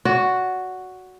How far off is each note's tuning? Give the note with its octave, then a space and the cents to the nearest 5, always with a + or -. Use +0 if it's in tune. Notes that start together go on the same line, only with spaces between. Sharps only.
F#4 +0 D5 -40